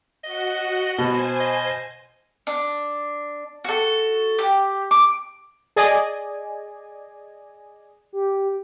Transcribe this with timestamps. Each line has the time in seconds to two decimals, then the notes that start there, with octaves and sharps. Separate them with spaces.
0.24 F#4 D#5 F#5
0.98 B2 C5 G#5
1.40 D#5
2.47 D4
3.64 F#4 A4
4.39 G4
4.91 D6
5.76 G#4 D5 D#5 G#5
8.13 G4